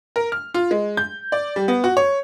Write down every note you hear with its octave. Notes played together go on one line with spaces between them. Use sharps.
A#4
F6
F4
G#3
G6
D5
G3
B3
F#4
C#5